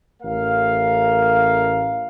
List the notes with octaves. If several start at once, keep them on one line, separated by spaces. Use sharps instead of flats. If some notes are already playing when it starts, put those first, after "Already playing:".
A1 A3 A#4 F5